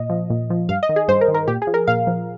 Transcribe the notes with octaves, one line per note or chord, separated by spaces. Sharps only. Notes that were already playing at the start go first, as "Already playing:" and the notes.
Already playing: A#2 D#5
F3
A#2
F3
G2 F5
D#5
D#3
G#4
G2 C5
A#4
D#3
A#4
A#2 G4
G#4
F3
A#4
A#2 F5
F3